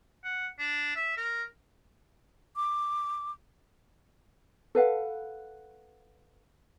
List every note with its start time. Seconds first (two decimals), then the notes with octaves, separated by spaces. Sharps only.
0.24 F#5
0.59 D4
0.96 E5
1.17 A#4
2.56 D6
4.75 A4 B4 F5 F#5